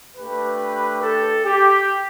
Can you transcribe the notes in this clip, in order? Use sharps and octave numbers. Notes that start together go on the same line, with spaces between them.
A3 D4 G4 B4
A4
G4